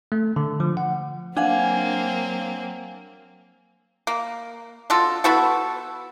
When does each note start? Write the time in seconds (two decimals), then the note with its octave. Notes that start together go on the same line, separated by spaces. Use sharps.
0.12 A3
0.36 D3
0.60 F3
0.77 F#5
1.37 F#3 A#3 C4 D4 F5 F#5 G#5
4.07 A#3
4.90 F#3 D4 F4 A4
5.24 B3 E4 F#4 A4